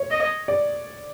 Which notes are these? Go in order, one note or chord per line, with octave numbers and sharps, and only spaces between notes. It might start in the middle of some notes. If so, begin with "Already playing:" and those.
Already playing: C#5
D#5
D5